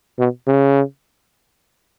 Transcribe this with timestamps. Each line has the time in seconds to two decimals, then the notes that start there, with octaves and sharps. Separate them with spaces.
0.19 B2
0.47 C#3